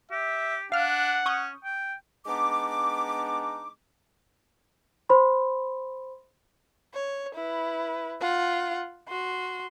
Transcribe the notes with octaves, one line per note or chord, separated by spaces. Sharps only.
G4 E5
D4 F5 F#5 F6
C#4 C#6 D#6 G6
G5
G#3 B3 D4 D#4 D6
C5 B5 C6
C#5
E4 B4
F4 F#5
F#4 C6